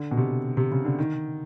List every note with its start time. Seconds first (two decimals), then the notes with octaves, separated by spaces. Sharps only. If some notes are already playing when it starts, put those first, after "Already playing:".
Already playing: D3
0.11 B2
0.17 C3
0.57 C3
0.71 C#3
0.85 D3
0.99 D#3